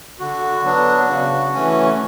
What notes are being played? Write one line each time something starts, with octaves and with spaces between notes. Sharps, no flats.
D3 F#4
F#3 B3 D4
C#3
E3 A3 C#4